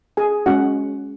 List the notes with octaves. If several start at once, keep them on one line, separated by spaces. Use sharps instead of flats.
G#4 G#5
G#3 C#4 F#4 F#5